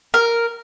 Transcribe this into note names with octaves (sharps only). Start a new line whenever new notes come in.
A#4